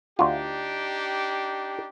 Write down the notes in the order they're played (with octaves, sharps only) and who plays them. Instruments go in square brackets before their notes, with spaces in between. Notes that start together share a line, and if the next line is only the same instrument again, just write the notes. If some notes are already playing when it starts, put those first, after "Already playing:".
[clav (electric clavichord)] D2 F4 [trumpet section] D4 D#4 G4